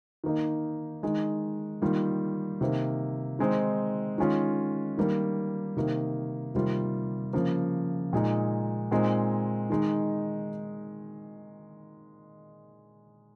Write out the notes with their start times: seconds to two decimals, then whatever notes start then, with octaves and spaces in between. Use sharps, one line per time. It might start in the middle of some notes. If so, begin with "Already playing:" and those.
0.24 D#3 A#3 D#4
1.03 D#3 G#3 D#4
1.82 D#3 G3 A#3 F4
2.61 C3 D#3 A#3
3.39 D#3 G#3 C4 D#4
4.18 D#3 G#3 C#4 F4
4.98 D#3 G3 A#3
5.77 C3 D#3 A#3
6.55 C3 D#3 G3 A#3 F4
7.33 C#3 F3 A#3
8.13 A#2 G#3 D#4
8.91 A#2 G#3 C4 D#4
9.70 D#3 G#3 D#4